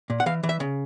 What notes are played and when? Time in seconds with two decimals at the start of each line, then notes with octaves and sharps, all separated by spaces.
0.10 A#2
0.20 F#5
0.26 E3 F5
0.43 E3
0.49 E5
0.60 C#3